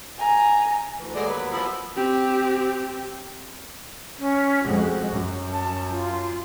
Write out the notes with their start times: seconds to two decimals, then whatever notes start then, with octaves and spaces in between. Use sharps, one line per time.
0.18 G#5 A#5
0.98 D2 E3
1.15 D#2 F#3 G#3 A3 B3 D5
1.28 B4
1.52 F3 B5 E6
1.96 C4 G4
4.18 C#4
4.64 F2 G#3 F#4
5.11 F#2
5.51 A5
5.90 F4